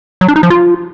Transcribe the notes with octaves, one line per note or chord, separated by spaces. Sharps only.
F#3
D4
D#4
F3
F4